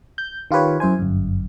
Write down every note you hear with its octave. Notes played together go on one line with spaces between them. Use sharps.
G6
D#3 F4 G4 B4 C#5
F#2 E4 C5 G#5
G1 F#2